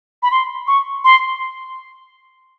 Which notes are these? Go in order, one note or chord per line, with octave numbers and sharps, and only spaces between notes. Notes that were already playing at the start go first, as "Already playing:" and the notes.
B5
C6
C#6
C6